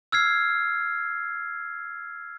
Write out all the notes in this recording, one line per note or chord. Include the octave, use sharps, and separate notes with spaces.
E6 F6 G#6 C7